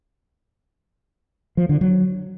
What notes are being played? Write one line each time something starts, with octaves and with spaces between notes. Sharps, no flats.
F3
D3
F#3